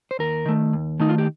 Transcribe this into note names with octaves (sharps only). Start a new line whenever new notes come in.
C5
D#2 A#4
D#3 A3
D#2
D#3 A3 D#4
F4
G4